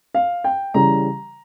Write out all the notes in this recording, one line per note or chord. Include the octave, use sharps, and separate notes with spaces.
F5
G5
C#3 E3 G3 A#5